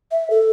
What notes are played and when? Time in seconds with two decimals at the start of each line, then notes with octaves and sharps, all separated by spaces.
0.11 E5
0.30 A4